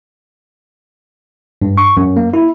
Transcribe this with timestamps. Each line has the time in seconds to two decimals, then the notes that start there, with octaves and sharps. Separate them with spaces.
1.62 G2
1.78 C#6
1.97 F#2
2.16 A#3
2.34 E4